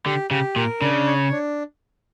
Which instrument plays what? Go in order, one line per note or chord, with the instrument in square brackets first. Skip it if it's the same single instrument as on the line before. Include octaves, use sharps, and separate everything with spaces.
[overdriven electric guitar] D3 [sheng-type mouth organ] G4
[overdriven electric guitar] C#3 [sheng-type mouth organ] G4
[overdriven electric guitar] A#2 [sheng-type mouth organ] A#4
[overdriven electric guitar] C#3 [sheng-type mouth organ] D4
[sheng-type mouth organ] C#5
D4